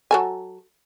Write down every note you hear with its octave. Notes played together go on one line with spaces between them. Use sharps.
F#3 A4 G#5